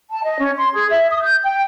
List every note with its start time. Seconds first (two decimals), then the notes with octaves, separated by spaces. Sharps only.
0.11 A5
0.24 D#5
0.38 C#4
0.57 C6
0.73 G#4
0.90 E5
1.10 D#6
1.22 G6
1.44 G5